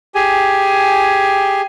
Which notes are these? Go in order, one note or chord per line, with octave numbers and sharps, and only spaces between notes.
G4 G#4 G#5